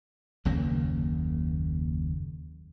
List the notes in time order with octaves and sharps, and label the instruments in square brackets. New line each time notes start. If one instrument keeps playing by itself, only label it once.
[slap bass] F#1 D#2 C#3 A#3